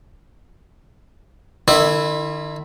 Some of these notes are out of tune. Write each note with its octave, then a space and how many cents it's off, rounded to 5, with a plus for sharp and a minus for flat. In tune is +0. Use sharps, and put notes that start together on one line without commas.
D#3 -45 E4 +0